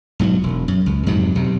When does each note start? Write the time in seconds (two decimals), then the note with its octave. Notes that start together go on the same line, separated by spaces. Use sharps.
0.19 B1 G#2 F3 F#3
0.43 E1
0.68 F#2
0.86 C#2
1.06 F2 G#2 C3 F#3
1.35 B1 C3